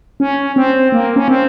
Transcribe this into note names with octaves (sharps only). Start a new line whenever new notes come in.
C#4
C4
A#3
C#4
C4